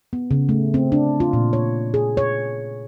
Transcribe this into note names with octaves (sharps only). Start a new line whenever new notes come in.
B3
C#3
A3
C4
D4
F4
A#2
C#5
G#4
C#5